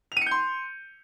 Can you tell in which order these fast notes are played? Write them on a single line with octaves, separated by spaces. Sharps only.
F7 D#7 C#7 G6 C6